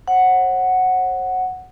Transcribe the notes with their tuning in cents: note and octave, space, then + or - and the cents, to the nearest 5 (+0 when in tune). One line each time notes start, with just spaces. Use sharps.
C5 +45 F#5 +0